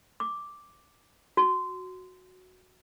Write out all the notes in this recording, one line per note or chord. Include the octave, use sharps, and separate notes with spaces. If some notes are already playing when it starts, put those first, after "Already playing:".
D6
F#4